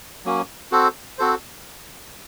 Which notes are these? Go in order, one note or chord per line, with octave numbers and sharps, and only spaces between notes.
F#3 A#3 C#4
C4 F#4 A4 C5
C4 F#4 A4 C5